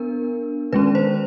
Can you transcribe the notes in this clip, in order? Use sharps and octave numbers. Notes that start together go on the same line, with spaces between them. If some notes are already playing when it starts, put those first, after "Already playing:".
Already playing: B3 D4 A#4
D#3 G#3 C#4 B4
C5